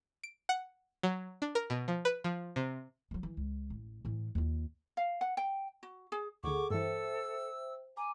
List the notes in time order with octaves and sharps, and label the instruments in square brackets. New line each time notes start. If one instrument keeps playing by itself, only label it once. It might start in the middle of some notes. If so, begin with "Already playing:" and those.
[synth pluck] D7
F#5
F#3
D4
A#4
B2
F3
B4
F3
C3
[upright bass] F#3 G#3
E3
C#2
A1
A2 E3
D#2 F4
[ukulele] F5
F#5
G5
F#4
G#4
[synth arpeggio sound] D2 D3 [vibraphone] G#4 A4 F#5 [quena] C#6 [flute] D6
[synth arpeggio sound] G2 E3 [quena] A4 [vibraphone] C5 E5 G5 [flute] E6
[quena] G#5 [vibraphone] A#5 D6